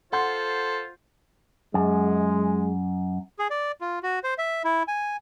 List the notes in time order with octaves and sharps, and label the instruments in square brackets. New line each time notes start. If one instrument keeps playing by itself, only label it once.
[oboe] F4 [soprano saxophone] A4 [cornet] C5 [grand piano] F#5 C6 G6
[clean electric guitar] F#2 [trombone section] G#3
[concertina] G#4
D5
F4
F#4
C5
E5
E4
G#5